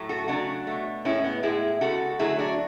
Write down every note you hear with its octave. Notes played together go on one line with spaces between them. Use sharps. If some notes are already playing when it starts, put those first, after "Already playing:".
Already playing: A2 F#3 A3
F#4 A4
C#3 F#3 A3 D4 F#4
B2 A3
A2 G#3 C#4 E4
B3
A2 G#3 E4 G#4
C#3 G#3 F#4 A4
D3 F#3 A3 E4 G#4
D4 F#4